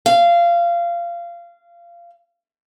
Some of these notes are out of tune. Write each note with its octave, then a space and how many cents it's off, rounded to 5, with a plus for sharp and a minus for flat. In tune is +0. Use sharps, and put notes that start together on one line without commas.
F5 -20